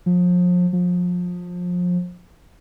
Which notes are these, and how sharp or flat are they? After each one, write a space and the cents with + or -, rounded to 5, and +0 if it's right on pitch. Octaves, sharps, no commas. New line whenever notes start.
F3 +35
F3 +30